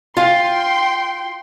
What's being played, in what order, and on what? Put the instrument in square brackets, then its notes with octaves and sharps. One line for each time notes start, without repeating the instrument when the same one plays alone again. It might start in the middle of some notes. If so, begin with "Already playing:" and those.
[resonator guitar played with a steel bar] F4 F5 [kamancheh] G5 C6